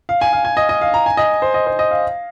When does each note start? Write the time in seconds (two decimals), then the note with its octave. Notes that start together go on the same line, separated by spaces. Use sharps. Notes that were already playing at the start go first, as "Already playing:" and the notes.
0.09 F5
0.21 G#5
0.33 F5
0.45 G#5
0.57 D#5
0.69 D#5
0.81 F5
0.94 A#5
1.06 G#5
1.17 D#5
1.42 C5
1.54 D#5
1.67 C5
1.79 D#5
1.91 F5